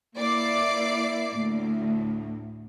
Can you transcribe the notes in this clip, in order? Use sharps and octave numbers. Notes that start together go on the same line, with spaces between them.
A#3 E4 D5 D6 C7
D2 A2